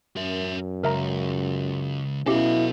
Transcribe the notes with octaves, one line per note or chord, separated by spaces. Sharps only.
F#2 A#4 E5
C#2 A#4 E5 A#5
B2 C#4 E4 G4 A4 F5